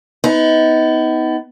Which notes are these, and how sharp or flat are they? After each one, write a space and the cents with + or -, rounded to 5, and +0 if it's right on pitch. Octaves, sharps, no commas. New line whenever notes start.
B3 +25 D#4 +30